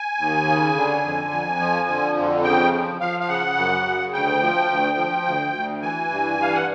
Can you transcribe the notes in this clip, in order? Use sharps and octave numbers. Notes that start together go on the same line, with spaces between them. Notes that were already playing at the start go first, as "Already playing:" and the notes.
Already playing: G#5
D#2
C#3
D3
F2
F2
F3
D3
F2
C#3 G5
F3
F3 F5
F5
C#3 F#5
F#2
C#3
D2 G5
F3
D2
F3
D2
D2
E3 G#5
G2
E3 F5
F#5